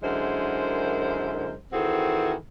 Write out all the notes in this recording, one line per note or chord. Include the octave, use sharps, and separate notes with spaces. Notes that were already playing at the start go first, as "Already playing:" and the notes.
F#2 D3 G#3 E4 A#4 C5
D#3 E3 C4 F#4 G#4 A4